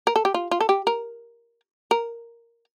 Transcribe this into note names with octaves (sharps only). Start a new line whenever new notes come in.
A#4
A4
G4
F4
F4
A4
G4
A#4
A#4